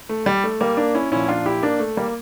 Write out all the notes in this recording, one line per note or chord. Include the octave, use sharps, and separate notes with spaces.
A3
G3
A3
G3 A#3
A#3 D4
C#4 E4
A#2 F3 C#4 E4
D4 F4
E4 G4
A#3 D4
A3
G3 A#3